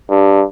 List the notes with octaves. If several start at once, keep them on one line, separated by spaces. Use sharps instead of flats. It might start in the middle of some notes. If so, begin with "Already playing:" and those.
G2